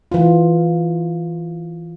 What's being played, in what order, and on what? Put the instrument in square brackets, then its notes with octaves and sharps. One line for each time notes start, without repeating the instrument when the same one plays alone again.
[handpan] E3 E4 F4